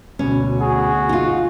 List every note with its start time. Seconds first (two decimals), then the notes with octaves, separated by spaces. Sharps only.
0.19 D2 B2 C#4
0.60 F#4 G#4
1.09 D#4 F4